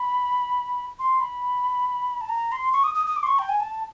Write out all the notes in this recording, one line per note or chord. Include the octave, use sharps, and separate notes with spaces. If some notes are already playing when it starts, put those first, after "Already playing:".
Already playing: B5
C6
B5
A5
A#5
C6
C#6
D#6
D#6
D#6
D6
C6
C#6
G5
G#5
A5